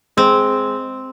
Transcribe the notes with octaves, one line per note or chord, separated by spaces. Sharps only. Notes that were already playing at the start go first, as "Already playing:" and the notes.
G#3 C4